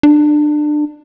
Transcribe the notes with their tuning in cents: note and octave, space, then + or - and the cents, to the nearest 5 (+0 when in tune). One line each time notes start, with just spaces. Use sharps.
D4 +25